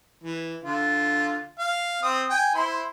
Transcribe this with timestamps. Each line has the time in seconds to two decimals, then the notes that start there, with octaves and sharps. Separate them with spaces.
0.24 E3
0.64 D3 F4
1.59 F5
2.03 C4 D#6
2.29 G5 G#5
2.55 E4 C5 C6